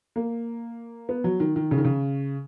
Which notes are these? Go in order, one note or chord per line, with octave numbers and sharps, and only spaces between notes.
A#3
B3
F#3
D#3
D#3
C#3
D#3
C#3